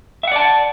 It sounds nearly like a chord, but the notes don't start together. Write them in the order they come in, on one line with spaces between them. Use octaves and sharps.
E5 F#5 D5 A5